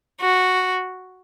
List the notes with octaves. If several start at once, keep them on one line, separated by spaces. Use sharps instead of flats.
F#4